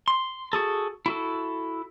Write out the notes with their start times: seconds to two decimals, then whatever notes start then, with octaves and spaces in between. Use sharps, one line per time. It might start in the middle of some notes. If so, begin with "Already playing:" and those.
0.08 C6
0.53 F#4 G#4 A4
1.06 E4 F#4 A4